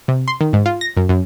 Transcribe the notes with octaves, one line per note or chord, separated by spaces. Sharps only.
C3
C6
D#3
G#2
F4
A#6
F#2
F#2